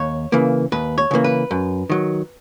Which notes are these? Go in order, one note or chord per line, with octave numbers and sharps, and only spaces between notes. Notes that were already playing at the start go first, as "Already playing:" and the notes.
Already playing: D#2 C#5
C#3 E3 A#3
D#2 B4
C#5
C#3 E3 A#3
B4
F#2
D#3 F#3